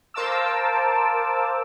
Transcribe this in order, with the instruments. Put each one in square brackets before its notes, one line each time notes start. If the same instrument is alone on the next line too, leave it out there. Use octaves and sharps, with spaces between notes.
[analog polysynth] A#4 C5 F5 A5 D6 E6